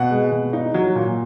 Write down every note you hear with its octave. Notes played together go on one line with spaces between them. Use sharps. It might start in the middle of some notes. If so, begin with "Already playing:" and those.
Already playing: B2 F#5
G#3
B2
D#4
F#3
A#2